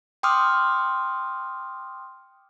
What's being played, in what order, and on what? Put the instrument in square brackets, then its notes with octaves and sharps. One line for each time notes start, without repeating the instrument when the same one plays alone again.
[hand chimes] G5 C6 D6 D#6 F6